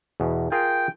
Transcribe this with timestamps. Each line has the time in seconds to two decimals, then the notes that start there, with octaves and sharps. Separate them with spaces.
0.20 E2 B2
0.52 F4 G#4 A#4 G5